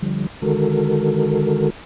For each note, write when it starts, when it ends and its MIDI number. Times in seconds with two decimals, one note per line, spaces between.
0.02 0.27 50
0.02 0.27 53
0.02 0.27 55
0.42 1.70 50
0.42 1.70 51
0.42 1.70 56
0.42 1.70 66
0.42 1.70 69
0.42 1.70 70